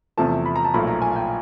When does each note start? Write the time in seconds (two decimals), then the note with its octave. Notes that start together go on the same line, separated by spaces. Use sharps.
0.17 E2 C3 F3 A3 A5
0.46 B5
0.56 A#5
0.65 A5
0.74 B1 A#2 F3 A3 B5
0.87 A#5
1.02 G#5
1.16 G5